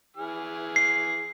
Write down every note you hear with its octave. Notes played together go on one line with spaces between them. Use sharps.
E3 G#4 F6
C7